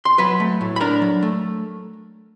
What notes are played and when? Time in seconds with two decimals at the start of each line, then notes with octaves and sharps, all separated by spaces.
0.05 C6
0.18 F#3 B4 B5
0.40 A3
0.61 A2
0.76 B5
0.81 D4 A#4 A#5
1.02 F#3
1.23 A3